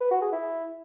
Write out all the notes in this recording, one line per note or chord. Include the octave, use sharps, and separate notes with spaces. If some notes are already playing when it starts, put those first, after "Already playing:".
B4
F#4
G#4
E4